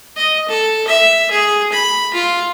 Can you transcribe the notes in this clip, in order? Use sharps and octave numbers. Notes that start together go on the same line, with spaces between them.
D#5
A4
E5
G#4
B5
F4